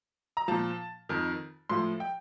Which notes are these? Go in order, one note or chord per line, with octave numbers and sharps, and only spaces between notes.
A#5
A#2 F3 A5
F2 D#3
A2 F3 C6
G5